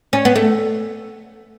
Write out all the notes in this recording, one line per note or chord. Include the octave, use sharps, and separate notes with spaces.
C#4
B3
A3